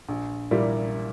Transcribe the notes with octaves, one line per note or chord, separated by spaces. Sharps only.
A#1
A#2 G3 A#3 E4